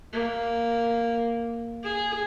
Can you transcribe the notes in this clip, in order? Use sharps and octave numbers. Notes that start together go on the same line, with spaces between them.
A#3
G#4